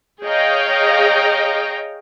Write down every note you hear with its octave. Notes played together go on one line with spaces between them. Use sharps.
G#4 C#5 D#5 F5 G5 A#5